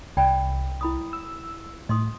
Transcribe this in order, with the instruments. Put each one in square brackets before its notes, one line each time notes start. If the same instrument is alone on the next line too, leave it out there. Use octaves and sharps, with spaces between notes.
[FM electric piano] C2 [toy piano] D5 G5 B5
[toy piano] E4 B5 D#6
[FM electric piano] E6
[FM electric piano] A2 [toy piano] D#5 C6 D#6